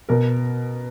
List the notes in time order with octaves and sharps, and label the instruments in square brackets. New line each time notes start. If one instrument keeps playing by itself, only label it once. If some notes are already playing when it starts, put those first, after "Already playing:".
[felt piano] B2 A#4